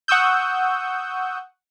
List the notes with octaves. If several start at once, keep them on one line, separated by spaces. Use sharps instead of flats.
F#5 C#6 D#6 E6 G6